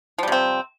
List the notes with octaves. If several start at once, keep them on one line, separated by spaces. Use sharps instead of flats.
C3 F3 G3 C4